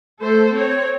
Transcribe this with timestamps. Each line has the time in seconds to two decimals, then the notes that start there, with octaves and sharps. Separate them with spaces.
0.21 A3 A4 C5
0.51 C4 C#5